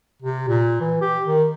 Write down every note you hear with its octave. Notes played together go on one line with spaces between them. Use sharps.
C3
A#2
E3
G4
D#3